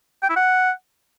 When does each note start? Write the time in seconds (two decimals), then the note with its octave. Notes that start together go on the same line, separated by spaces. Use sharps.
0.23 G5
0.29 E4
0.36 F#5